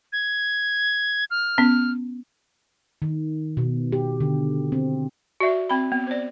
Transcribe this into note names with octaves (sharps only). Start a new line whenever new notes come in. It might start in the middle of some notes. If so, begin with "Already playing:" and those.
G#6
F6
B3 C#4
D#3
B2
G4
D3
C4
F#4 D5 E5
C4 B5
B3
C5 D5